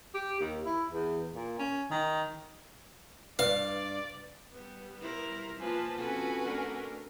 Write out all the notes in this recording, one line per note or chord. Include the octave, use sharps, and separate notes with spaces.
G4
D#2
E4
E2
A#2
C#4
D#3
G2 B4 D5 F5
G3 B3
E4 A#4 C5
F3 A#3 F4 B4 G#5 A5
C4 C#4 F#4 A4 B4 G#5
A3 D4 A#4